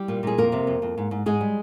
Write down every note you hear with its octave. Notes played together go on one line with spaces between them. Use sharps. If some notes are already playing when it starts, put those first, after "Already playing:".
Already playing: G3 G4
A#2
A#2 G#4
F2 A#3 A#4
C3
F2
F2
G#2
G#2
G#2 G#3 G#4
G3